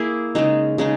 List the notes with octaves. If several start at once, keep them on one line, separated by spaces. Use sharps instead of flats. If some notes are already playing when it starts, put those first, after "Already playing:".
Already playing: A#3 E4 G#4
C#3 G#3 D#4
C#3 G#3 D#4